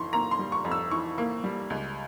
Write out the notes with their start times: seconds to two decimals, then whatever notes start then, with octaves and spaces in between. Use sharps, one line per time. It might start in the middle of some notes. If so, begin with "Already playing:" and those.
Already playing: F2 E3 C6 C#6
0.13 A#3 A#5
0.31 C6
0.39 G3
0.52 C#6
0.65 F2
0.71 E6
0.91 E3 C#6
1.18 A#3
1.44 G3
1.70 C#2